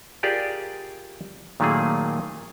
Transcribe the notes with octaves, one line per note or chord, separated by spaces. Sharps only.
F4 G4 G#4 A#4 D5
A#2 D#3 F#3 A3 A#3 G#4